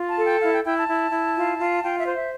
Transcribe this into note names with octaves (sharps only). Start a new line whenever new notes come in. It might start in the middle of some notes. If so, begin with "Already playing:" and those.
Already playing: F4
A5
A4
G5
E4 F5
G5
E4 G5
A5
E4
E4
F4
F4
F4 G5
E5
C5
E5